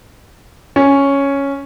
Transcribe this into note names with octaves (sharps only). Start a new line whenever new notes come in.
C#4